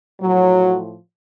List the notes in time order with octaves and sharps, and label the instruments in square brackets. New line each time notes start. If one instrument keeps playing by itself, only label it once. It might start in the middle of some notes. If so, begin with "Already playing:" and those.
[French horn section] A2 F3 F#3